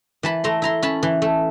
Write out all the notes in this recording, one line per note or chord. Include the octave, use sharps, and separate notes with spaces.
E3 A5 B5
A3 A#5 C6
E4 A#5 C6
C#4 A5 B5
E3
A3